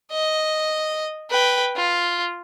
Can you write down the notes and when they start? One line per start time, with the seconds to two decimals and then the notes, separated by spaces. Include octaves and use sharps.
0.12 D#5
1.30 B4 G5
1.76 F4